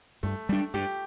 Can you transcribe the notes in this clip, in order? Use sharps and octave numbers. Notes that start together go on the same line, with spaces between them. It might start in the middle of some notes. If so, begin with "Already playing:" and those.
G2 A3
G3 D4
G2 G4